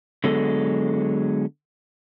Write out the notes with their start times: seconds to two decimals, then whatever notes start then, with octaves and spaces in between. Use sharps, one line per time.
0.24 D3 F#3 G#3 B3 A4